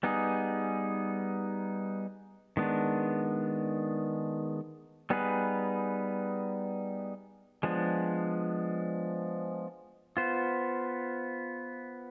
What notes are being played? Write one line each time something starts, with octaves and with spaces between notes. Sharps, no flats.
G3 B3 D#4 G#4
D#3 G#3 B3 D4
G3 B3 D#4 G#4 B4
F3 G#3 B3 D4
B3 F4 C5